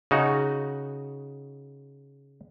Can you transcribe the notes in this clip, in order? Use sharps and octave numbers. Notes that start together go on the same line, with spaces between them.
C#3 D#4 F#4